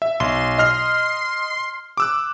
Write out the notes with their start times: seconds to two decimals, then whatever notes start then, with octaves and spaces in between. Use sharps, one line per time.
0.02 E5
0.20 B1 C6
0.58 D#5 F6 C7
1.97 D6 E6 F#6